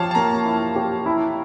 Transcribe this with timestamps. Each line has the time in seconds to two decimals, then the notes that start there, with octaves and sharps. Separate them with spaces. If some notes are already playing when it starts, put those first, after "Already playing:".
Already playing: F3 G4 C#5 F5 A5
0.11 A5
0.15 A#3 A#5
0.45 E4
0.75 G4
1.06 E4